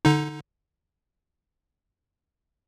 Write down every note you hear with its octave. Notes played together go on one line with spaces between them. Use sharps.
D3 D#4